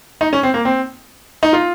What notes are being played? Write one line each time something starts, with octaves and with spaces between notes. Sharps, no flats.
D#4
C#4
C4
A#3
C4
D#4
F4